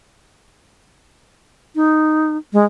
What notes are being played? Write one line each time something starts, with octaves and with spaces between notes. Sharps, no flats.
D#4
G#3